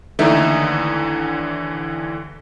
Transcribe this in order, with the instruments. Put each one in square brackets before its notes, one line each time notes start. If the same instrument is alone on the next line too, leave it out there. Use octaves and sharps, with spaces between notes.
[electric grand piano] D#2 D3 E3 [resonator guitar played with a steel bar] A3 D#4